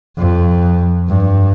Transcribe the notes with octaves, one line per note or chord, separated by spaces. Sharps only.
F2
G2